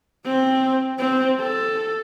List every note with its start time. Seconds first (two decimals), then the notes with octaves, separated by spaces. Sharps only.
0.25 C4
0.99 C4
1.40 A4